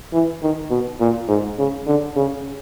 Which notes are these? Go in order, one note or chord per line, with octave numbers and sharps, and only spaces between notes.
E3
D#3
B2
A#2
G#2
C#3
D3
C#3